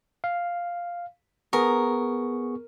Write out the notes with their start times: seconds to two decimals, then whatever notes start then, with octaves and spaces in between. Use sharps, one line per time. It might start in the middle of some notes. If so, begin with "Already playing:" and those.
0.24 F5
1.53 B3 G#4 A#4 C#6